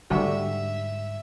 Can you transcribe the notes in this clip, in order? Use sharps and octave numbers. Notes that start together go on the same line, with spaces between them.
G#2 D3 G3 F#4 E5